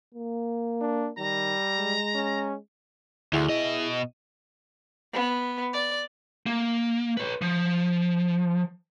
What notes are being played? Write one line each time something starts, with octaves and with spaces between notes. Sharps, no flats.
A#3
D4
D#3 G3 A#5
G#3
C#4
D2 E4 G#4 E5
B2 D#5
B3
D5
A#3
B4 C#5
F3